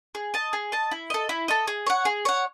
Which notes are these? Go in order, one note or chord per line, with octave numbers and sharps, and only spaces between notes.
G#4
D#5 A5
G#4
D#5 A5
E4
A4 D#5
E4
A4 D#5
G#4
C#5 F#5
G#4
C#5 F#5